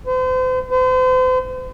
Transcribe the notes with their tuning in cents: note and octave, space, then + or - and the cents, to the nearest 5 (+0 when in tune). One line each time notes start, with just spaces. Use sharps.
C5 -40
C5 -40